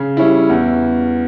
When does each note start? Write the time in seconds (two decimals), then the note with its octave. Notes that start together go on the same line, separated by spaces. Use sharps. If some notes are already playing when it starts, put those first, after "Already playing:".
Already playing: C#3
0.17 G3 C#4 E4
0.49 E2